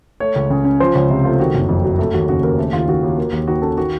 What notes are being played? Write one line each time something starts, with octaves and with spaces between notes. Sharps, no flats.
A3 C#5
C#2
C#3
C#4
F3 C5
C#2 C#5
C3
A3 F4
D#3 F#4
F#1
F2
F#3
A3
D#2 F#4
C#3 F#4
D#2 A#4
A3 A4
D#2 F4
D#3 F#4
D#2
A#3
D#2
D#3 F#4
C#4 A4
D#3 F#4